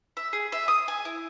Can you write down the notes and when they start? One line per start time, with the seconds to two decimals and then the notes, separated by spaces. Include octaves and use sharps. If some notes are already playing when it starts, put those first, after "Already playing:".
0.17 E5
0.33 G#4
0.52 E5
0.68 D#6
0.88 G#5
1.05 E4